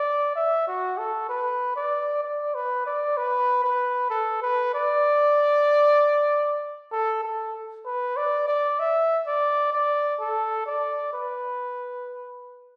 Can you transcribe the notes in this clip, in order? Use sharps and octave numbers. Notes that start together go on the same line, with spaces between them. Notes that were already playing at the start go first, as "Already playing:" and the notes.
Already playing: D5
E5
F#4
A4
B4
D5
D5
B4
D5
B4
B4
A4
B4
D5
A4
A4
B4
D5
D5
E5
D5
D5
A4
D5
B4